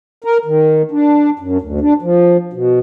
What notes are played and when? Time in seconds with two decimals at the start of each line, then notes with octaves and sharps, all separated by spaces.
0.24 A#4
0.45 D#3
0.91 D4
1.39 F#2
1.61 D2
1.81 D4
2.02 F3
2.53 B2